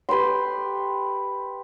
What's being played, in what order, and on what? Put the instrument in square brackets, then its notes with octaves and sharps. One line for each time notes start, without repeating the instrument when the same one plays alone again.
[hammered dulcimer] G4 B4 G5 C6